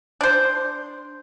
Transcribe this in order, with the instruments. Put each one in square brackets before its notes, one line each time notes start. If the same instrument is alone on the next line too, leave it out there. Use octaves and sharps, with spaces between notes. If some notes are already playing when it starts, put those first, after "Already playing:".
[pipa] D4 C5